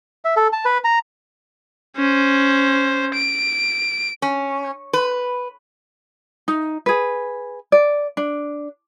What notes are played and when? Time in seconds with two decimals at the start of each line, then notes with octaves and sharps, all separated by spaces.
0.25 E5
0.36 A4
0.53 A5
0.65 B4
0.84 A#5
1.97 C#4 C5
3.14 D7
4.22 C#4
4.93 B4
6.48 D#4
6.86 G#4 B4
7.72 D5
8.17 D4